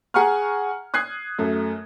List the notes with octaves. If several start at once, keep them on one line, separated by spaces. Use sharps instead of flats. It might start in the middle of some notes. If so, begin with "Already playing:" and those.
G#4 F#5 G#5 A#5 C#6 F6
D#6 F#6 G#6 C7
F#2 A3